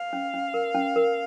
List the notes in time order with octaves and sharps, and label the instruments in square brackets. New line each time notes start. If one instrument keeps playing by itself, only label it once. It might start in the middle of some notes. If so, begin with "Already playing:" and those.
Already playing: [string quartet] F5
[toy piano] C#4
C#4
A#4
C#4
A#4